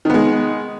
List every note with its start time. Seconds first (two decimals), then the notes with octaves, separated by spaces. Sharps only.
0.05 D#3
0.10 B3
0.14 G#3